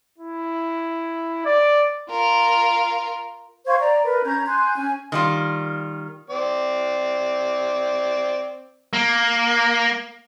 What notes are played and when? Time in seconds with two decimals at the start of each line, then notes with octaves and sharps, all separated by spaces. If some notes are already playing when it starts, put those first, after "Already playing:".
0.18 E4
1.45 D5
2.10 F4 A#4
3.66 C5 F5 C#6 G#6
3.79 D5 A#5
4.04 A#4 B4
4.24 C#4 A#5 G6 G#6
4.47 G#5 C6 F#6 G6
4.76 C#4 G#5
5.12 D#3 G3 F4
6.30 C4 D5
8.93 A#3